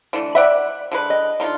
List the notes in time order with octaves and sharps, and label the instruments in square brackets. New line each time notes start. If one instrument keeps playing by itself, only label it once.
[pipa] D3 E3 A3
[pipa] D5 F#5 B5 [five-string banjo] E5
[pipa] D3 G#3 B4
[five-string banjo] D#5
[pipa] D3 D#4 F4